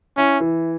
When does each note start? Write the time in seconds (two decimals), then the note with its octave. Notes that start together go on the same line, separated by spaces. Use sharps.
0.17 C#4 E4
0.40 E3